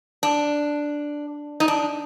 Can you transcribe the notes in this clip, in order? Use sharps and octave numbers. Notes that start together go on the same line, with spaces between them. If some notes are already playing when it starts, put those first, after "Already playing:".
D4
D#4
D4